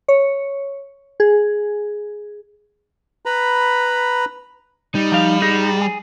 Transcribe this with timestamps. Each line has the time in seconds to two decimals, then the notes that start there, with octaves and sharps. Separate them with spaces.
0.08 C#5
1.20 G#4
3.26 B4 A#5 B5
4.95 G3 D#4
5.12 F3 F5
5.42 D#4 G#4 A#5
5.82 G#4